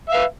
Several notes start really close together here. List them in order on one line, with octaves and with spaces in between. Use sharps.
E5 F5 B4